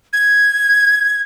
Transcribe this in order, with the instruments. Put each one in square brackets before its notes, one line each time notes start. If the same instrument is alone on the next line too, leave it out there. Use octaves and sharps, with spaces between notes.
[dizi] G#6